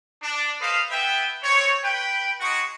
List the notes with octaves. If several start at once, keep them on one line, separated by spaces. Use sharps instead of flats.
D4
A4 B4 C5 D#5 F5
B3 B4 E5 G5
C4 C#5
B4 G5
G#3 D#4 F#4 G#4 C#6